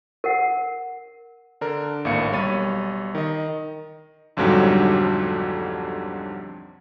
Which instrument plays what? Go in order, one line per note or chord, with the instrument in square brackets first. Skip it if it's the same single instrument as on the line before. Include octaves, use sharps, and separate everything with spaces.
[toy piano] A#4 F#5
[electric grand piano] D3 D4 A#4
G#1 D2 A2 A#3 F5 C#7
B1 G3 C#5 B5 A6 D#7
D#3 D#5
B1 F2 G#2 D3 F#3 G3